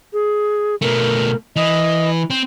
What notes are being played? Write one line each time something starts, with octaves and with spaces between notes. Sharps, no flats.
G#4
B2 A3 A#4
E3 D#5
C4